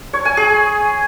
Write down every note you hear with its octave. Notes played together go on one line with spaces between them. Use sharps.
C#5
G#5
G#4